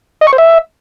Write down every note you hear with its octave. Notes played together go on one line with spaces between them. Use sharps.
D#5
C#6
C5
E5